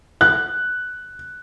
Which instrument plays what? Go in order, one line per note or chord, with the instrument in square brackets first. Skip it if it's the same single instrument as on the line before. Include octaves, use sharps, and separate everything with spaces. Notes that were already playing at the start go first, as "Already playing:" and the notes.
[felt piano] F#6